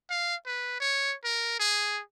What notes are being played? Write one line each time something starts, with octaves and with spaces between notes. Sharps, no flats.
F5
B4
C#5
A#4
G#4